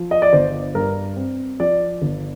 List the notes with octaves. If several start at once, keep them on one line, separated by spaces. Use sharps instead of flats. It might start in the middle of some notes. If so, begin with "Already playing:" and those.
Already playing: F3
D#5
D5
G1 C5
G2 A#4
C4
F3 D5
G1